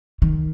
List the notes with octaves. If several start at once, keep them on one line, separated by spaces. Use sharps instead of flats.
D#3